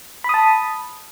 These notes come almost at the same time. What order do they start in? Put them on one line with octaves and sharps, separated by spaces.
B5 D#6 A5